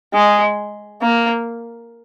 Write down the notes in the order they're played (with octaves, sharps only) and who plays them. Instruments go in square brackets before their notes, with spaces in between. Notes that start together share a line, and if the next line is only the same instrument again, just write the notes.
[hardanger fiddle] G#3
A#3